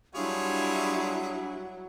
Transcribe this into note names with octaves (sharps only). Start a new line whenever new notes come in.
F#3 G3 D4 E4 F4 G#4 C#5